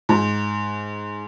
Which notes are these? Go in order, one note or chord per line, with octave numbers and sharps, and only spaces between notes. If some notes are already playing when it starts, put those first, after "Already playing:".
G#2